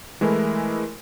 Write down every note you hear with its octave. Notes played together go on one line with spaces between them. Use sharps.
E3 G#3 A3 E4 A#4